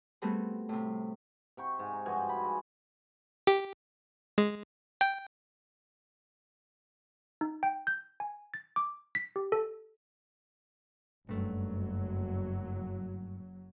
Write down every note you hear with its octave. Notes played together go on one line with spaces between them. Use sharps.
G3 A3 B3 C4 F#4 G#4
A2 C3
C3 G5 C#6
G#2
D#4
G2 F3 F#4 G#5
B5
G#3
G4
G#3
G5
D#4
G5
G6
G#5
A6
D6
B6
G4
A4
F#1 G2 F#3 A3